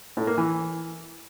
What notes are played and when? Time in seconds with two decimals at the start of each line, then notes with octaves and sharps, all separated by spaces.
0.17 A2
0.27 A#3
0.38 E3